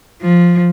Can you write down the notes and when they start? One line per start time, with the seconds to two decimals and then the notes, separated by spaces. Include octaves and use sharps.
0.22 F3